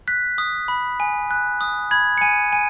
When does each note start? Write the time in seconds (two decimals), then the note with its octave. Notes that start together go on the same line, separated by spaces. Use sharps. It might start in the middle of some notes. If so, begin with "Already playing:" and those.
0.08 F#6 B6
0.38 D#6
0.68 B5
1.00 G#5
1.31 F#6
1.61 D#6
1.91 B5 G#6
2.18 C#7
2.21 G#5 D#7
2.53 G#5 D#7